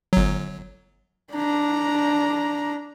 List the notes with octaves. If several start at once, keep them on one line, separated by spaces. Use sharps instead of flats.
G1 F#3
D4 A#5